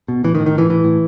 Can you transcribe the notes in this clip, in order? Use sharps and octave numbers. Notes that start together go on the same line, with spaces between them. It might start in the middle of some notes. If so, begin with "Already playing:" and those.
B2
A2 E3
D#3
A2
D#3
A2 E3
A2 E3
A2